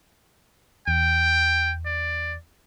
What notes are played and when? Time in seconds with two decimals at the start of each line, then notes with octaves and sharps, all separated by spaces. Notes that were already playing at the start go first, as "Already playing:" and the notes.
0.88 E2 G5
1.85 D5